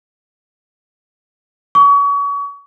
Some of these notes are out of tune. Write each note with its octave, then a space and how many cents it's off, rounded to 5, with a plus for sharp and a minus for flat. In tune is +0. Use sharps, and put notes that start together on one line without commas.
C#6 +35